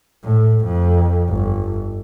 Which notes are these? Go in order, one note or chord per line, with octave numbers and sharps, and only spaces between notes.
A2
F2
G1